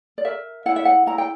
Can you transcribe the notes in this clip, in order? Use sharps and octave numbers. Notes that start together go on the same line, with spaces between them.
D5
A#4 E5
E4 F#5
E5
F#5
E4 A#5
G5